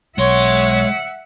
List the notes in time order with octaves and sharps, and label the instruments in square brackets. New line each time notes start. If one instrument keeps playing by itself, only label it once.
[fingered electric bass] B1 [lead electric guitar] G#3 C6 [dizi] C#5 [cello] E5 F#5